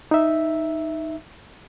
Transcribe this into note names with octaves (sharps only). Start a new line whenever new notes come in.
D#4 E5